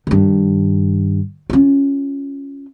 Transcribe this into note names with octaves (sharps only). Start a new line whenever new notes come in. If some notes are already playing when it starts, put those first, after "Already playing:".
G2 D#3
C#4 F4